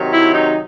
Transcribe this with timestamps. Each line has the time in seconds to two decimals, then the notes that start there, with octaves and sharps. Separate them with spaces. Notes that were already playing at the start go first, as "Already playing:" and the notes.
Already playing: C3 D#3 F#3
0.11 E4
0.33 D#4